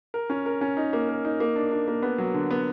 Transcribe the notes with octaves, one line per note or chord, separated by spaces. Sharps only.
A#4
C#4
A#4
C#4
D#4
A#3
A#4
D#4
A#3
D4
D4
A#3
B3
F#3
D3
B3